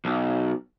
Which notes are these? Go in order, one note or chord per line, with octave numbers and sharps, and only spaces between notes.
B1